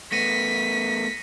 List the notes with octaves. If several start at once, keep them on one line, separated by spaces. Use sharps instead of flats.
A3 B3 A#6 B6 C#7 D#7